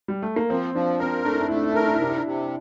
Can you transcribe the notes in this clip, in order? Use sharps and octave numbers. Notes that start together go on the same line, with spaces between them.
G3
A3
A#3
F3 C4
F3 D4
C4 A#4
A3 D4
E4
D4
A3 E4
D4
E4
D4
E4 A#4
D4
E4
C3 D4
E4
D4
C3